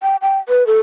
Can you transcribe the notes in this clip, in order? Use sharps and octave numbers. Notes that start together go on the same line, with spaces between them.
G5
G5
B4
A4